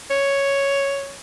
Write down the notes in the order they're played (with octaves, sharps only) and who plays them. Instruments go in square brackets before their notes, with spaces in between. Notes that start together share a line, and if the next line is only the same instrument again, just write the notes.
[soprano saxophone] C#5